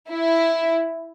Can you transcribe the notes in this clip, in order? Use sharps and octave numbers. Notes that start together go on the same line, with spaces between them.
E4